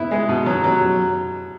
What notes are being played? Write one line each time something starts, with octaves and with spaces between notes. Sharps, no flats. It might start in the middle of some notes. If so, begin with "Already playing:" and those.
Already playing: B3 E4
G#3
B2
F#3
F#3